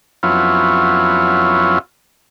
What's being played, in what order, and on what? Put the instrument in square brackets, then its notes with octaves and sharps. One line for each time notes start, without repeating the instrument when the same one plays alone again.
[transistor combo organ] F2 F#3 B3 C#4 E4 F4